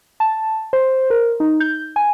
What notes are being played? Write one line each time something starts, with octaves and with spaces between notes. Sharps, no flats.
A5
C5
A#4
D#4
G6
G#5